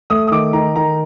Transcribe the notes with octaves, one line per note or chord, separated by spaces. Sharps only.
A3 D#6
D#6
D#3 D6
D#3 A#5
D#3 A#5